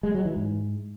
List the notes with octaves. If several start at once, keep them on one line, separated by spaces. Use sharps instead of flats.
G#3
F#3
E3
G#2